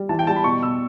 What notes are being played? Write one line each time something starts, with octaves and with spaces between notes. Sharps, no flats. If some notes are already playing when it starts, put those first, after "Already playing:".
Already playing: G3
E3 A5
G5
G3 A5
B5
B2 C#6
B2 E6